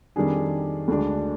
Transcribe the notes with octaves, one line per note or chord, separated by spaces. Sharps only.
F2 D#3 G3 D4 G#4
D2 D3 G#3 D4